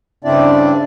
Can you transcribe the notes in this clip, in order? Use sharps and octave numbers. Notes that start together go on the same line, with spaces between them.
G2 C#3 C4 D4 E4 D5